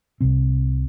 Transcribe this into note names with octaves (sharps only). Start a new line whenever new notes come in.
C2 C3 C4